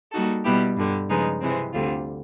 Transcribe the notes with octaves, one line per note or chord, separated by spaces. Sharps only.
G3 A#3 D#4 F#4 A4
B2 G3 B3 E4 G4
G2 D3 G3
C#3 F3 G#3 B3 D#4
C3 E3 G#3 C4
D2 D3 G3 C4 F4